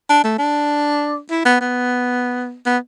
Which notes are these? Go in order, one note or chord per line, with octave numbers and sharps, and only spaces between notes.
D4
A3
D4
E4
B3
B3
B3